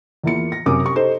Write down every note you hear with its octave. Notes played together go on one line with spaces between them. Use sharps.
E2 A#3 E4 F4 C#7
A#6
F#2 C3 C#4 A#4 D6 D#6
G4 C#6
D#4 G4 A4 C5